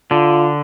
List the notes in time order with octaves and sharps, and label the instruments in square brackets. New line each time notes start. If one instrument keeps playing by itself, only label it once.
[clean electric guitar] D3 [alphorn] F4